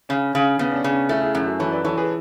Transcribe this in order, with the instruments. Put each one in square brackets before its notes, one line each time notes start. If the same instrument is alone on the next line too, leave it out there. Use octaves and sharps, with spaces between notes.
[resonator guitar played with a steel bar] C#3 [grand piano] C#4
[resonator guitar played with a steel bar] C#3
[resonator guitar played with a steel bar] C#3 [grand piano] B3
[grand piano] D4
C#4
[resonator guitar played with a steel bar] C#3
[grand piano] C#4
[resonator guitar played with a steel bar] A3 [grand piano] C#4 E4
[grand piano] E4 G#4
[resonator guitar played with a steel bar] F#2 [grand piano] C#4 E4
[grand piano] F#4 A4
[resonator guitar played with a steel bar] E3 [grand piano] A4 C#5
[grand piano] B4 D5
[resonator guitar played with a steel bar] E3 [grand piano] A4 C#5
[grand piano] G#4 B4